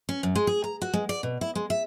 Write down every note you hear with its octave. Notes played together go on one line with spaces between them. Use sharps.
C#4
F#2
G#3
G#4
A#5
F#4
G#3
D5
B2
E4
G#3
E5